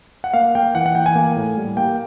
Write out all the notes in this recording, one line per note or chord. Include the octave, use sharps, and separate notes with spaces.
F#5
A#3 F5
A#3 G5
E3 F#5
F#5
E3 G5
G#5
A#3
A2
G3
A#3 G5